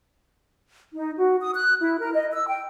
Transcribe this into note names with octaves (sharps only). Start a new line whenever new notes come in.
D#4
F#4
D#6
F#6
E4
A#4
D#5
E6
G5